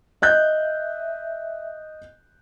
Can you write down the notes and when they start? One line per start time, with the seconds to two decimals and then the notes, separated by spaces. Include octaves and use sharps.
0.22 D#5 E5 F#6 G6